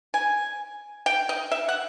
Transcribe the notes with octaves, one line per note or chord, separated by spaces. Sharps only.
G#5
G5
D#5
E5
F#5